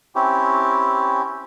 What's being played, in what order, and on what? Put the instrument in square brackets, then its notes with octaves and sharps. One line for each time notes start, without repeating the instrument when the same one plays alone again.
[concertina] C4 C#4 E4 G4